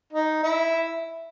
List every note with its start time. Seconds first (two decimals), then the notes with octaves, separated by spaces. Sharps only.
0.13 D#4
0.43 E4